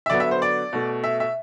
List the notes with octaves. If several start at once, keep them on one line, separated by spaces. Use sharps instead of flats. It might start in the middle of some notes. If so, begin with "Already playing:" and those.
E5
D3 F#3 B3 D5
E5
C5
D5
B2 A3
E5
E5